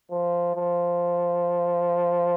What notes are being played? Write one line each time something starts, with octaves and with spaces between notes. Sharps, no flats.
F3
F3